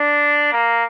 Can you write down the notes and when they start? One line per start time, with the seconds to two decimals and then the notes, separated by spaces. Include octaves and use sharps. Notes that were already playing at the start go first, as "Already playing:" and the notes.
Already playing: D4
0.52 A#3